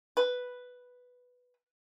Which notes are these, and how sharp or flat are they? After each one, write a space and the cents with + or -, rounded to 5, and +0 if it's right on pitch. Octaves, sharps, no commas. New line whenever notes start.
B4 +0